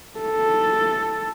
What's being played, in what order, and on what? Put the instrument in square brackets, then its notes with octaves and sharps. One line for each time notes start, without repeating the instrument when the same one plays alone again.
[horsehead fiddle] A4